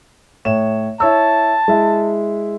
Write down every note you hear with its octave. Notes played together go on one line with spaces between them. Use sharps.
A2 C#5 E7
E4 C#5 A5 E6
G#3 E4